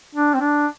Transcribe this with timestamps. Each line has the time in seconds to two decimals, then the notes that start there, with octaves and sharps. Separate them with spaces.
0.15 D4
0.34 C4
0.40 D4